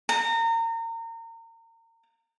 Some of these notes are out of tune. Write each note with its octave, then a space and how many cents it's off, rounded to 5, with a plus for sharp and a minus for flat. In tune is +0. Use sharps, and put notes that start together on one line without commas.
A#5 -30